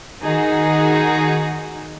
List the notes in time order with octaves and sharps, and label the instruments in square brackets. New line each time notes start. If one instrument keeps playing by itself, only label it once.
[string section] D#3 D#4 F#4 G#4